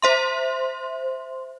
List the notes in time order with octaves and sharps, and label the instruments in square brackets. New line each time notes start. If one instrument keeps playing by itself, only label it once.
[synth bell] C5 E5 C6